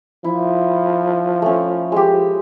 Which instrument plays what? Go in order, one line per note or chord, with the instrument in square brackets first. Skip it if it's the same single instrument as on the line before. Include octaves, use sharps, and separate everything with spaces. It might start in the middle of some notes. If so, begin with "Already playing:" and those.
[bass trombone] F3 [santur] E4
[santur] A3 C#4
G#3 G4